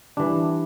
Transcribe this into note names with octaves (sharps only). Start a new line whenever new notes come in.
E3 G3 D4